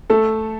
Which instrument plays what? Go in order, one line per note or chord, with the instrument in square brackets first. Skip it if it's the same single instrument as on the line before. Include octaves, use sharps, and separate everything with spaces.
[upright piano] A3 A4